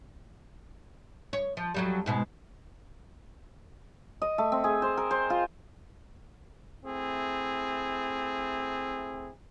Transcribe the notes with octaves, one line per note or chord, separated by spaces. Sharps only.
C#5
F3
F2 F#3 G3
G#2 B2 G#3
D#5
A3
C4
G#4
C5
A#4
C5
F4
A3 C4 E4 G#4